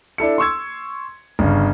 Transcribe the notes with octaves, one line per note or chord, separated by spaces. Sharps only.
D4 E4 A4 C#7
C6 C#6 E6 G#6
G1 C#3